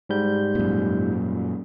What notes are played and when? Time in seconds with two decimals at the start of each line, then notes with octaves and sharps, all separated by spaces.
0.09 G#2 G3 G6
0.55 F#2 A#2